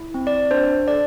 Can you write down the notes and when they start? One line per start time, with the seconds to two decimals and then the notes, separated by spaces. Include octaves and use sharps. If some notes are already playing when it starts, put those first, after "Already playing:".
Already playing: E4
0.14 C4
0.27 D5
0.51 D4 C5
0.88 A4 D5